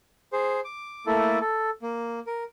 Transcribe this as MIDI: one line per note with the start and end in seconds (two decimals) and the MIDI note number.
0.33 0.60 68
0.33 0.60 72
0.65 1.06 86
1.06 1.38 57
1.06 1.38 58
1.06 1.38 64
1.06 1.38 69
1.41 1.70 69
1.82 2.20 58
2.27 2.44 70